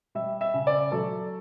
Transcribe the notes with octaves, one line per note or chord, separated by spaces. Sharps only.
G3 E5
E5
C#3
D5
F#3 A4